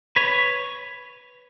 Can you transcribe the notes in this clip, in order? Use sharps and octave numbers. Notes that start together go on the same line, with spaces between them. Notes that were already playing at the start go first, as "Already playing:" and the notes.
B4 C#5